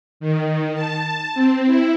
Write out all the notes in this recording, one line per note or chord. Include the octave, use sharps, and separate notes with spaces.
D#3
A5
C4
E4